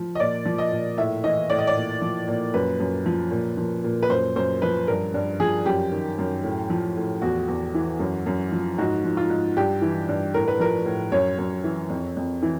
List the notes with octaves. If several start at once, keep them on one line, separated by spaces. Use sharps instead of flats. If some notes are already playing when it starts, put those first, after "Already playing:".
Already playing: F3
D#5
A#2 D5
F3
D#5
A#2
A2 E5
E3 D#5
A2 D5
D#5
D5
A#2
F3
A#2
F#2 B4
F#2
F3
A#2
F3
A#2
B4
F#2 C5
F#2 C5
F3 B4
G2 A#4
G2
F3 G#4
F#2 G4
D#3
F#2
A2
F3
A2
E2 F#4
E2
E3
F#2
F#2
F3
G#2 F#4
F3
F4
G#2
G2 G4
E3
G2
A2 A#4
B4
F3 A#4
A2
F#2 C#5
F#2
E3
F2
F2
E3